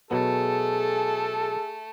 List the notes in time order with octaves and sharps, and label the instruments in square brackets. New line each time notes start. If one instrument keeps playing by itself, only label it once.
[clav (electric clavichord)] B2 F#3 B3 [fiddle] A3 [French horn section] G#4 [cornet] A4